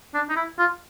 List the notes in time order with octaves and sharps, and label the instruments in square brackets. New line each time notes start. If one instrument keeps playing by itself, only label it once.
[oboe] D4
D#4
E4
F4